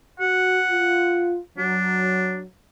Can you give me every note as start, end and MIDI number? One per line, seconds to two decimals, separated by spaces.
0.20 0.59 66
0.20 1.34 78
0.69 1.37 65
1.58 2.44 54
1.58 2.40 62